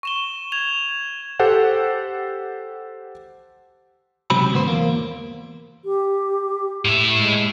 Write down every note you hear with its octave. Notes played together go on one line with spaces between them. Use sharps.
C#6 E7 G7
G#6 F7
G4 A4 C5 F#5
C#2 C3 F#3 C4 B5
D2 G#2 B3 C5
E2 A#3
G4
A2 E5
G#3